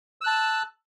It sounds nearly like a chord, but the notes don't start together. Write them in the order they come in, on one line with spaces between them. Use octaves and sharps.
E6 F#6 A5